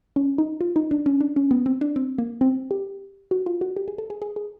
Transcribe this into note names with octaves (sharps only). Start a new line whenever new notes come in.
C#4
D#4
F4
D#4
D4
C#4
D4
C#4
B3
C4
D4
C4
A#3
C4
G4
F#4
F4
F#4
G4
G#4
A4
G#4
G#4
G#4